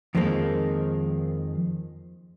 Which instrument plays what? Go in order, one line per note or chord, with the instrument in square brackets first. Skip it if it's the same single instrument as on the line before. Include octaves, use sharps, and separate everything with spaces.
[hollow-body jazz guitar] F2 D#3 F3 G#3 A#3 D#4